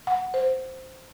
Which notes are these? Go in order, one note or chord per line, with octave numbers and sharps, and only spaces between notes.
F#5
C5